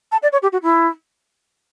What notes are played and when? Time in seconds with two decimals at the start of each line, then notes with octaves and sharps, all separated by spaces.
0.12 A5
0.22 D5
0.32 C#5
0.42 G4
0.52 F#4
0.63 E4